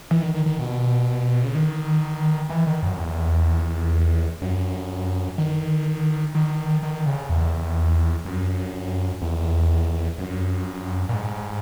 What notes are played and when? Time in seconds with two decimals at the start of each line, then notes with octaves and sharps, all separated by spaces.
0.11 E3
0.22 D#3
0.34 D#3
0.46 D#3
0.59 B2
1.43 C#3
1.55 D#3
2.50 E3
2.67 D#3
2.82 F#2
2.98 E2
4.42 F#2
5.38 D#3
6.35 D#3
6.83 D#3
7.06 C#3
7.29 E2
8.25 F#2
9.22 E2
10.18 F#2
11.09 A#2
11.14 G#2